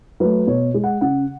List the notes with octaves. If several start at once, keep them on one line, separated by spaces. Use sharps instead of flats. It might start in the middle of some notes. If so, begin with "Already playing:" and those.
F#3 A3 B4
B2 C#5
G#3
F#5
C#3 F#5